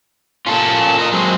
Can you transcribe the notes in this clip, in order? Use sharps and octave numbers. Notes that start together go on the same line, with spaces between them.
A#3 C#4 F4 A4
A#4 D#5
F#3 G#3 C4